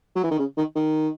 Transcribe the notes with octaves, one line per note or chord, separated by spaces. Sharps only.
F#3
E3
D#3
C#3
D#3
D#3